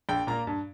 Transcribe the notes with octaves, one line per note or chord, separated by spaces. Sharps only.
A#1 G5
A#2 A#3 A#5
G2